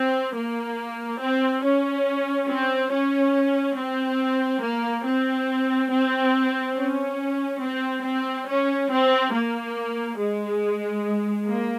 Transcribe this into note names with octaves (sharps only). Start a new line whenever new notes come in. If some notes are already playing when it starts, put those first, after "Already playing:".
Already playing: C4
A#3
C4
C#4
C4
C#4
C4
A#3
C4
C4
C#4
C4
C4
C#4
C4
A#3
G#3
A#3